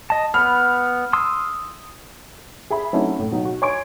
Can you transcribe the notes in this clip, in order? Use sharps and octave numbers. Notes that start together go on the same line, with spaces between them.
D#5 A5
B3 B5 F6
C6 D#6 E6
G#4 E5 B5
F#3 A3 C4 C#4 D#4 E4
A2
B2 F#3 D#4
F#4
C#5 G#5 C6 C#6 G#6 D7